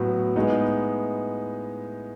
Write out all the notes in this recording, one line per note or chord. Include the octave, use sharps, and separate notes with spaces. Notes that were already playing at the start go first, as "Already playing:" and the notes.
Already playing: A2 F#3 B3 F#4
A2 G#3 B3 D#4